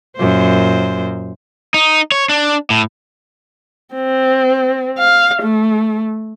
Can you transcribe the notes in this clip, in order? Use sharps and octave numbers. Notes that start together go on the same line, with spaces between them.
F#2 A#2 C5
D#4
C#5
D4
A2
C4
F5
A3